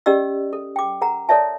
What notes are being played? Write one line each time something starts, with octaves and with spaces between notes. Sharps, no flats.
C#4 G4 D5 D#5 E6
A4
G5 D6
A#4 F#5 A#5
A4 A#4 C#5 D5 E5 A5